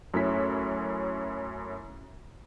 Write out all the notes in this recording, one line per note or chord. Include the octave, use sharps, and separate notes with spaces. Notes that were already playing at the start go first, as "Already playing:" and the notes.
F#2 A3 C#4 E4 B6